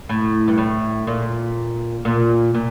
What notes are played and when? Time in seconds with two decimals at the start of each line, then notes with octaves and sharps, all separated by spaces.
0.09 A2
0.48 G2
0.58 A2
1.07 A#2
2.05 A#2
2.55 A#2